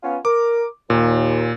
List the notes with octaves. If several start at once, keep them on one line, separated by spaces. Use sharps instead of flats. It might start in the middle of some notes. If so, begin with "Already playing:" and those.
B3 C#4 F4
A#4 D6
D#2 A#2